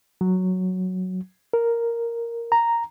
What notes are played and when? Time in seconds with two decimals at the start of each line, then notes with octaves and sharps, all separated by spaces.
0.21 F#3
1.54 A#4
2.52 A#5